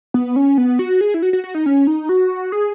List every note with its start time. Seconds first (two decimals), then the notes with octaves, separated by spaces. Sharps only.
0.14 B3
0.36 C#4
0.58 B3
0.79 F#4
1.01 G#4
1.14 E4
1.22 F#4
1.33 F#4
1.44 F#4
1.55 D#4
1.66 C#4
1.87 D#4
2.09 F#4
2.52 G#4